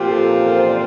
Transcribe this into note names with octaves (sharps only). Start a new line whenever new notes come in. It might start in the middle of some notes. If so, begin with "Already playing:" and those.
Already playing: A#2 F3 C4 F4 G4
A4
A#4
C5
D5